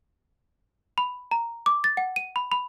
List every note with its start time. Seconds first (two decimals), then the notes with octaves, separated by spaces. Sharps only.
0.98 B5
1.31 A#5
1.66 D6
1.84 A6
1.97 F#5
2.16 D#7
2.36 B5
2.52 B5